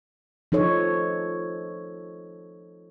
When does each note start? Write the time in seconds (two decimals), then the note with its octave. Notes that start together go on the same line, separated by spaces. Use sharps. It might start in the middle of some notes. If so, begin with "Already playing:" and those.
0.52 F3 D#4 A4 C#5